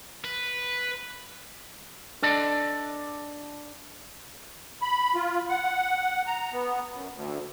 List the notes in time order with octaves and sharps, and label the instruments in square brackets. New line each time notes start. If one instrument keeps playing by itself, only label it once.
[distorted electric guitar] B4
[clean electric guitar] D4 A4 D5 D#5 A5
[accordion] B5
F4
F#5
A#5
B3
F#2
D2